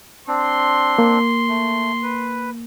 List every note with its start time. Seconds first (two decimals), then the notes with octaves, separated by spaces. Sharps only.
0.28 C4 D4 C6
0.99 A#3
1.49 A3
2.03 B4